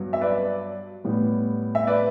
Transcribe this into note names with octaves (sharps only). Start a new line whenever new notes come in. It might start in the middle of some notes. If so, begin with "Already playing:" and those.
Already playing: G2 F#3 B3
E5
B4 D5
A2 G3 B3
E5
B4 D5